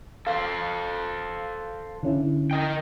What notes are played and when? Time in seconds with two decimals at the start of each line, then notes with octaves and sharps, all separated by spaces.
0.27 A4 C5 F5
2.03 D3 C#4 E4
2.51 A#4 D#5 G5